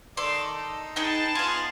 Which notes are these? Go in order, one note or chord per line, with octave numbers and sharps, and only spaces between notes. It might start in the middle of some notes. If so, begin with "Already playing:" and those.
D#3 A4 D5 C6
D#4
D#4 G#4 B4 D#5 G5 A5
B3 F4 G#4 D#5 C6